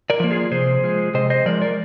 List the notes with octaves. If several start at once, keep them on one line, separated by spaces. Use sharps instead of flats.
A#4 D5
F3 A#3
F4 G#4
C3 G#4 C5
F3 G#3
C3 C5 D#5
C5 D#5
F3 G#3 A#4 D5
A#4 D5